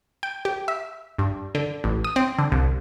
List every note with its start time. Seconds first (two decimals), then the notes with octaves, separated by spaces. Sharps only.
0.23 G5
0.45 G4
0.68 E5
1.19 G2
1.55 D3
1.84 A1
2.04 D#6
2.16 C4
2.39 D3
2.52 C2